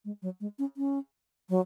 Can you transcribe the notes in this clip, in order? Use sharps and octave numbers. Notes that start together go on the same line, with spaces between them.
G#3
F#3
G#3
C#4
C#4
F#3